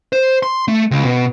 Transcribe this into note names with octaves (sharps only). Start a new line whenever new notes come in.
C5
C6
A3
C#2
B2